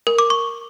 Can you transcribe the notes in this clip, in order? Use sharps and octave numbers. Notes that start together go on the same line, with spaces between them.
A#4
D6
C#6